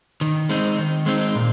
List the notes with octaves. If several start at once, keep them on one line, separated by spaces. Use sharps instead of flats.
D#3
G#3 C4 D#4
D#3
G#3 C4 D#4
A#2